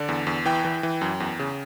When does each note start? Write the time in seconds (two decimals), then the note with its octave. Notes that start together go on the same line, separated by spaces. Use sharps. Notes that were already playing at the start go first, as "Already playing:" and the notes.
Already playing: D3 D5
0.09 E2
0.27 E2
0.45 E3 G5
0.65 E3
0.83 E3
1.01 F#2
1.20 E2
1.39 C#3